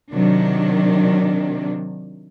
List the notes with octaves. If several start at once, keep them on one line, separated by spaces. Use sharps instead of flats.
C3 D#3 F#3 D4